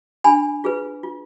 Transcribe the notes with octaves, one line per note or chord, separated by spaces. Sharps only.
D4 G#5 B5
F4 G#4 B4
F4